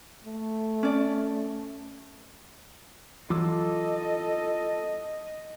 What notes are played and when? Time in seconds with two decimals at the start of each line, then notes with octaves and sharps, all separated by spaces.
0.24 A3
0.83 C#4 D5
3.30 E3 F#3 F4 A4 D#5 D6 E6